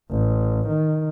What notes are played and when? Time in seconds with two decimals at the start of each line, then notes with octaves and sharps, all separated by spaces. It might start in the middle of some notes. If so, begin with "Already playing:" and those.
0.10 A1
0.68 D#3